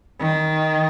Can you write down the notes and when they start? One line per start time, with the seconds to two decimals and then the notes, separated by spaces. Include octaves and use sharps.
0.20 D#3